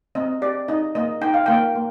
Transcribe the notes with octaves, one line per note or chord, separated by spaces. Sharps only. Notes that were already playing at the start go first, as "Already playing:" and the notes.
C4 D#5
G4 D5
D#4 D#5
A#3 D#5
D#4 G5
F5
A#3 G5
A#3